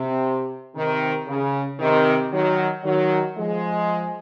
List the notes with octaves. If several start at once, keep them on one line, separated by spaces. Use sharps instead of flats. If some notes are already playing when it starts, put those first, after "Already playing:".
Already playing: C3
C3 D#3
C#3
C3 D#3
D#3 F#3
D#3 F#3
F3 G#3